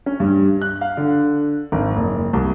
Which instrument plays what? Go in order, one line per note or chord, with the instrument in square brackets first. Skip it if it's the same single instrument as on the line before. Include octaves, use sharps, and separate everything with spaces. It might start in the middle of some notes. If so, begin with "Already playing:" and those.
[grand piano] C#4
G2
F#6
F5
D3
G#1
F#1
C2